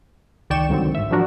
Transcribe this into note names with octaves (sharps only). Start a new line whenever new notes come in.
C#2 D#3 D5 G5 C#6 E7
C2 G#2 D3 D#3 F#3 C4
G#1 E5
F3 F#3 D4 F#4 A#4